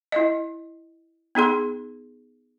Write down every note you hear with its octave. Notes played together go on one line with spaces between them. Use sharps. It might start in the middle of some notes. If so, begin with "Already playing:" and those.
E4 D#5
B3 D#4 G#4 C6